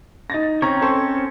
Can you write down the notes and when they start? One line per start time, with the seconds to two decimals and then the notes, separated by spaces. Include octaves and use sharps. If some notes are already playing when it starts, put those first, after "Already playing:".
0.30 D#4 A6 A#6
0.62 C4 C#4 C#5 A#5
0.81 A4 C5 C#6